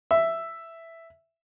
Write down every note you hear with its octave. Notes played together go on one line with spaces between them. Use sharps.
E5